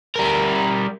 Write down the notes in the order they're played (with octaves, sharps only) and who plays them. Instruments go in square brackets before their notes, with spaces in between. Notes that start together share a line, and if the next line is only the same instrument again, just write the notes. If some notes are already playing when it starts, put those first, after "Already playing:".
[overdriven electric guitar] G3 A#4